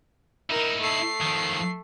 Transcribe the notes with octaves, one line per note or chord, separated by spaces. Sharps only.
D#4 E4 A#4
A3 C7
F2 D#3